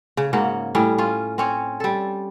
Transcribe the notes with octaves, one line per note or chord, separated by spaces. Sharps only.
C#3
G#2 C#3 A#3 F#4
A2 G3 C#4
C#4 F4
C4 C#4 C#5
G3 A4